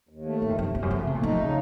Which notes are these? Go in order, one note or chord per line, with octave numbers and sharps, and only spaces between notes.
D#2
A3
A2 D#3
F2
F#2 C3
F2 C3
F#2
F3 A3
C#3
C3 A3
A#2
F#2 D#4
F2
C#3